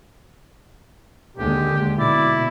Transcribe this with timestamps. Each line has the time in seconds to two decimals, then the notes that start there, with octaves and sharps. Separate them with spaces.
1.37 D#2 D3 G#3 G4
1.99 B2 E4 D5